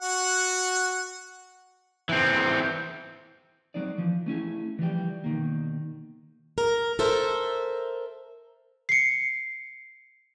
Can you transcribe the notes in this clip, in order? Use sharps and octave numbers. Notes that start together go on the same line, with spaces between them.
F#4 F#5
E3 C4
F#3 G#3 C4 D#4 D5
E3 F3
A3 C#4 E4 G#4
E3 F3 G3 G5
B2 D#3 A#3
A#4
A4 A#4 C5 E5
C7 C#7